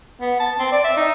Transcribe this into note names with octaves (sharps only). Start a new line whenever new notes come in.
B3
A5
C4
D5
E5
D#4